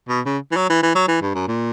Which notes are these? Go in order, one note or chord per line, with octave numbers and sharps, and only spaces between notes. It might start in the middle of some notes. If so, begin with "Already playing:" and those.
B2
C#3
E3
F#3
E3
E3
F#3
E3
G2
F#2
A#2